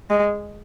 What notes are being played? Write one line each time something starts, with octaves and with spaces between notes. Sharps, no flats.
G#3